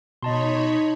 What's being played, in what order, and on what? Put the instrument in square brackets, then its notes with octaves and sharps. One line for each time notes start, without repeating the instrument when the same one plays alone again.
[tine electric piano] B2 [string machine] D#4 C#5 B5 [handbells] D#5 A5 C6